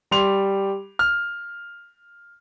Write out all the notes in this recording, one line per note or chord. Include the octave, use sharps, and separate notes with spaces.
G3 C6 F7
F6